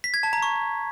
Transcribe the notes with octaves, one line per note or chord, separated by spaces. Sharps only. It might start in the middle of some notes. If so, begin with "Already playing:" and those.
B6
G#6
A5
A#5
C#6